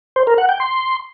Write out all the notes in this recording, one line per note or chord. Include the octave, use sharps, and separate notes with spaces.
C5
A#4
F#5
G5
C6